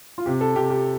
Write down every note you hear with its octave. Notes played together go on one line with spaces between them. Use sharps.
F4
C3 G4
A4
C3 G4
G4